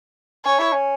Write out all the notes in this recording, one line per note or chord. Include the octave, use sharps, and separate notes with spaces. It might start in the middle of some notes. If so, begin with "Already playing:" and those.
C#4 C#5
E4
C#4